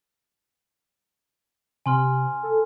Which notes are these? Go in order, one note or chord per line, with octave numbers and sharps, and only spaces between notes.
C3 G#5 C6 F6
A4